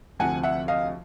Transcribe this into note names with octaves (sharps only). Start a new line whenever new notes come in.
D2 C3 F3 F#5 G#5
E5 F#5
D#5 F5